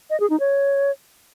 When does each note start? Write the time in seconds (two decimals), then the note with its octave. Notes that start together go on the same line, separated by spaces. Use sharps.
0.10 D#5
0.20 G#4
0.30 D#4
0.40 C#5